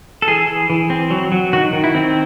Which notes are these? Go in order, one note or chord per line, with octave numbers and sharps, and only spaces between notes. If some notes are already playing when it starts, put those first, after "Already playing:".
A4
E3 G#4
E3
E3
C4
F#3
F#3
D#3 F#4
D#3
E4
C4